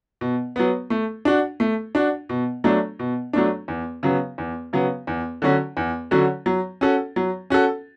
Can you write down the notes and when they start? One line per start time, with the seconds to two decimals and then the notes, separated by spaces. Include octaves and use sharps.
0.21 B2
0.56 F#3 B3
0.90 A3
1.25 D4 F#4
1.60 A3
1.95 D4 F#4
2.29 B2
2.64 F#3 A3 D4
2.99 B2
3.33 F#3 A3 D4
3.68 E2
4.03 C#3 F#3 B3
4.38 E2
4.73 C#3 F#3 B3
5.07 E2
5.42 D3 F#3 C#4 F#4
5.77 E2
6.11 D3 F#3 C#4 F#4
6.46 F#3
6.81 C#4 F#4 A4
7.16 F#3
7.50 C#4 F#4 A4